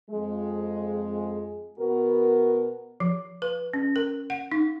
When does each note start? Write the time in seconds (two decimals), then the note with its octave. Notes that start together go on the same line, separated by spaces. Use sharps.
0.10 F2 G#3
1.78 B2 B3 F#4 A#4
3.00 F3
3.42 B4
3.73 C#4
3.96 A#4
4.30 F#5
4.52 D#4